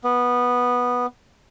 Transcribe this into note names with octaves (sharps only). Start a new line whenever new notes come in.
B3